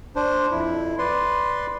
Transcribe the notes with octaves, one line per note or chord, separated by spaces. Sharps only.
D4 C5
F2 E4
B4 D5 C6